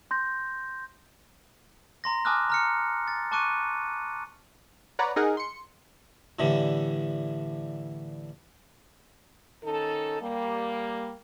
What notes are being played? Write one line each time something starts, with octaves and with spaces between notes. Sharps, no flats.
C6 G6 A#6
A#5 C6 A#6
G#5 A5 D6 D#6 F6 F#6
A#5 F6 C#7
A6
A5 C#6 D6 F#6 C#7 D#7
B4 C#5 D5 F#5 A#5
D#4 G#4 A#4 F#5
C6 C#7
A2 D3 E3 G3
D#3 C#4 D#4 A4
G3 A#3